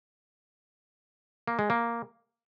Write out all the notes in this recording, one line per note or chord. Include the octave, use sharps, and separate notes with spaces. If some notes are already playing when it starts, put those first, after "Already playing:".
A#3
G#3
A#3